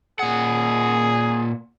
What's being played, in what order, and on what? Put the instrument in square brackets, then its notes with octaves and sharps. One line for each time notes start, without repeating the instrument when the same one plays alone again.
[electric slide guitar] A#2 F#5 [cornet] G#4